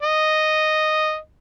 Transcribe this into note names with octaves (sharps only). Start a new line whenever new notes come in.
D#5